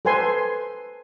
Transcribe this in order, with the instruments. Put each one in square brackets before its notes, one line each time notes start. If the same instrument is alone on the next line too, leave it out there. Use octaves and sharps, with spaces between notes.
[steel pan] A4 B4 C5 G#5 C6